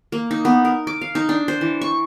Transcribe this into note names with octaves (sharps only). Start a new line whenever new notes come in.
A#3
D#4
B3
A#4
D6
F5
D#4
D4
C5
E3
C#6